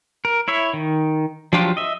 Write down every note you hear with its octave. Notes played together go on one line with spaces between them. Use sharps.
A#4
E4 C#5 E5
D#3
F3 F#3 D4 F4 G4
D#5 E5